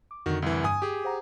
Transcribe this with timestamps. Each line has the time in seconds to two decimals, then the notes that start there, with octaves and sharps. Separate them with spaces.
0.11 D6
0.26 F2 D3 D#3 F#4
0.42 C2 E3
0.64 G2 G#5 D#6
0.82 G4 G#4 D#6
1.04 C5 F#5 A#5